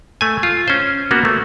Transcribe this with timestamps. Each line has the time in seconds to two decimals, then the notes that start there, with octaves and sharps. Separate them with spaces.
0.21 A3 G#5
0.43 F4
0.68 C#4 C5
1.11 A#3 B3 F#4
1.25 A3